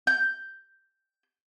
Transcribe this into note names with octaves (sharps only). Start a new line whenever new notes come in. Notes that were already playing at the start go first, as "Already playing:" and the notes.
G6